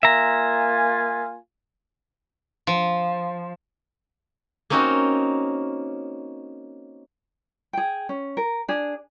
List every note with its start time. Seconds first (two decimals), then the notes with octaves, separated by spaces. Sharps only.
0.03 A#3 F4 E5 G#5 A#5
2.67 F3
4.70 A#3 C4 C#4 D#4 F#4
7.73 G#4 G5
8.09 C#4
8.37 A#4
8.68 D4 G#4